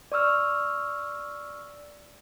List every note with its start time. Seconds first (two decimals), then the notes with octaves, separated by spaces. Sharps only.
0.12 D5 C#6 E6 F6